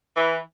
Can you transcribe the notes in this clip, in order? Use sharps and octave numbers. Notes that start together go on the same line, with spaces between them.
E3